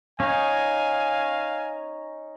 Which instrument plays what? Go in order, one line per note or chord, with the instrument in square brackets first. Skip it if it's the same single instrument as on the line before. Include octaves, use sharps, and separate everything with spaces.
[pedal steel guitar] C#4 D#4 [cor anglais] F5 [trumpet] G#5